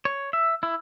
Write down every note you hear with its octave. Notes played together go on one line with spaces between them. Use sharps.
C#5
E5
E4